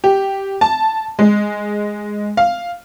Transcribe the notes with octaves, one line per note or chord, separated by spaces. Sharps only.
G4
A5
G#3
F5